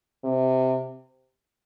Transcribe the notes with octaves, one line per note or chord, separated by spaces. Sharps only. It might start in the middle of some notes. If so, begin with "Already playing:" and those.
C3